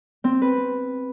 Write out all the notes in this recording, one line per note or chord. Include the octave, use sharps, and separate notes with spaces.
C4
B4